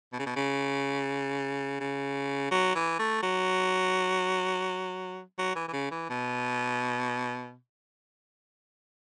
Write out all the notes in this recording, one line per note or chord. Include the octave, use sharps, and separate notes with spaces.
B2
C#3
B2
C#3
C#3
F#3
E3
A3
F#3
F#3
E3
E3
C#3
E3
B2